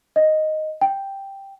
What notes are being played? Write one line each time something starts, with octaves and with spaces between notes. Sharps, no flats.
D#5
G5